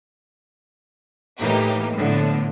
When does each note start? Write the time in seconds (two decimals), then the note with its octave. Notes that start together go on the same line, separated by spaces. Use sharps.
1.40 A2 E3 A#3 D#4 G4
1.96 A2 D3 F3 B3